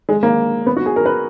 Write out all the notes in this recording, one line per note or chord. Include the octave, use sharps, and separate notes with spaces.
G#3
A#3
B3
F#4
G#4
A#4
B4